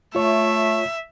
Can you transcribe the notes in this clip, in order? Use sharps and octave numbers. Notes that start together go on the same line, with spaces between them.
A3 F4 C#5 E5